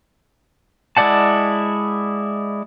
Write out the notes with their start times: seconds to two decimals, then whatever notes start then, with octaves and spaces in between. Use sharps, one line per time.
0.97 G#3 E4 D5 F#5 A5